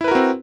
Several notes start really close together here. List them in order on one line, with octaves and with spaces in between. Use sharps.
E4 B4 A#4 F#4 C4